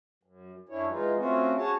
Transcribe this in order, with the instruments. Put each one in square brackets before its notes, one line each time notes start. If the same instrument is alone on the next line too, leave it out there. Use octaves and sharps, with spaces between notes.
[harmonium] F#2
F#2 C#4 D4 E4 C#5
E3 G#3 D#4 F4
A3 C4 C#4 F4 F#4
C#4 F#4 G#4 C#5 A5